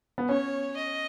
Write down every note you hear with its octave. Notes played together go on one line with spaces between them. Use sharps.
B3
C#4 C#5
D#5